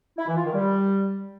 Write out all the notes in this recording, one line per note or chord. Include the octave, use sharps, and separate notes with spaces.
E4
E3
F4
D#3
G3